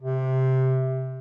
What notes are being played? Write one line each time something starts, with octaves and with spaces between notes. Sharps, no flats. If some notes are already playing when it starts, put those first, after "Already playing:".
C3